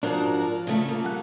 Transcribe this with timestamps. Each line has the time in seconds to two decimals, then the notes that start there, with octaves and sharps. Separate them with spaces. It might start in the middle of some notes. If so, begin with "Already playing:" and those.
0.03 G#2 F3 D4 F#4 A#4 F#5
0.44 F4
0.67 C#3 A3 A4
0.89 A#3
1.05 G3 F#5 F#6